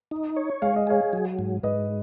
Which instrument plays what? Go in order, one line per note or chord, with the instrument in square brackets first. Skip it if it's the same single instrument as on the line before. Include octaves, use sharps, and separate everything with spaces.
[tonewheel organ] D#4
C#5
[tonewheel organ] G#3 [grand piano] F5
[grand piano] D#5
[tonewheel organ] G#4 [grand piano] C#5 F5
[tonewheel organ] F#3
G#2
[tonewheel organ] G#2 [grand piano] B4 D#5